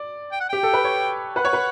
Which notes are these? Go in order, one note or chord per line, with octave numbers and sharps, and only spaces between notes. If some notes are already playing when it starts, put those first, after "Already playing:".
Already playing: D5
G5
F#5
G4 G5
A4
B4
C#5
B4 F#5
C#5
B4